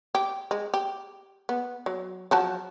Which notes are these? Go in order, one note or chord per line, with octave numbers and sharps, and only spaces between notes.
G4
G#3
G4
B3
F#3
F3 F#3 A5